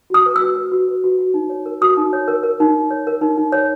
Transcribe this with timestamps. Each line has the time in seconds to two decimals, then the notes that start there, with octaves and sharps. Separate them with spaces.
0.10 F#4 D#6
0.26 B4
0.36 F#4 E6
0.56 B4
0.72 F#4
0.88 B4
1.04 F#4
1.19 F#4
1.34 D#4
1.50 C#5
1.66 A#4
1.81 F#4 D#6
1.97 D#4
2.13 C#5
2.28 A#4
2.43 A#4
2.60 D#4
2.74 D#4
2.91 C#5
3.07 A#4
3.21 D#4
3.38 D#4
3.52 C#5